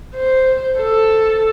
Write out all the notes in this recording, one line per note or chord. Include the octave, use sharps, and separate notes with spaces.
C5
A4